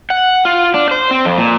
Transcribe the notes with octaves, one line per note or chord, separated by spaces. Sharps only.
F#5
F4
D4
C5
C4
F2
A#2